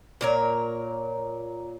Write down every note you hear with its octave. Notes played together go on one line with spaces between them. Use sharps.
A#2 A#4 C#5